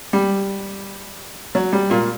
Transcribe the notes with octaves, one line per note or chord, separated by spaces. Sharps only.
G3
F#3
G3
A#2 A#3